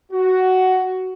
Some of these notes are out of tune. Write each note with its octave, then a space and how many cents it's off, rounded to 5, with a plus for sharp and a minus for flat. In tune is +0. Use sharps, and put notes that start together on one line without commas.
F#4 +10